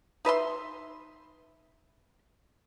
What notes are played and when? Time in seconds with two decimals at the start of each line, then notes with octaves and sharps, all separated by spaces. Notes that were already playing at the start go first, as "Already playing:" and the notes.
0.25 D#4 B4 E5 C6